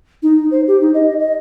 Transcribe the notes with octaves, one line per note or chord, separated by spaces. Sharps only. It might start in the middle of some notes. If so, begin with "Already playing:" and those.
D#4
C5
G4
D#4
D#5
D#5